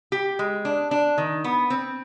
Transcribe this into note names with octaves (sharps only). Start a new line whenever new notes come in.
G4
G#3
D4
D4
D#3
B3
C4